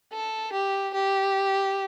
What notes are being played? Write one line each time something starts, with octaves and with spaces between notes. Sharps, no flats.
A4
G4
G4